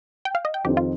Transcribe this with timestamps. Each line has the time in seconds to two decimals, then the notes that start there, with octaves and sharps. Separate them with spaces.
0.25 G5
0.35 F5
0.45 D#5
0.54 G5
0.64 F2 D#3 C4 G4
0.77 F4